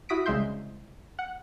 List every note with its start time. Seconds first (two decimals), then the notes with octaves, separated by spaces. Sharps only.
0.09 E4 F#4 D#6 B6 D7
0.26 C2 C#3 G#3 E5 C6 G6
1.19 F#5